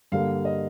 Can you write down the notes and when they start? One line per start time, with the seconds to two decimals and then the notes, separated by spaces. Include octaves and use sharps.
0.12 G2 D3 G3 A#3 F5
0.45 D#5